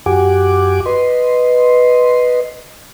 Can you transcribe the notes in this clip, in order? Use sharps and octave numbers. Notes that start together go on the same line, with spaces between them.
F#2 F#4 G4 F#5 G#5 D6
B4 D#5 C6